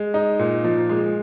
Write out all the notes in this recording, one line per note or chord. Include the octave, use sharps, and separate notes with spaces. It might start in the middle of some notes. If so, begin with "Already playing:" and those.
Already playing: G#3
D#4
A#2
F3
G#3